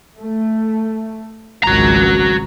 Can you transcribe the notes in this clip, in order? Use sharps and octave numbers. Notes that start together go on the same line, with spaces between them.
A3
G#1 C#2 F#4 A#5